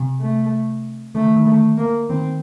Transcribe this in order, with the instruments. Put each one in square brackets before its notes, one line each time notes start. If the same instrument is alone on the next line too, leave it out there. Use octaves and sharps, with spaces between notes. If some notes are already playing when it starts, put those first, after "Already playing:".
Already playing: [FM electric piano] C3
[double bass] A3
[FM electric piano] D3 [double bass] A3
[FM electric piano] D#3
D#3
[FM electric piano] D3 [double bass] A3
[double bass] A#3
[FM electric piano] D#3 [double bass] C4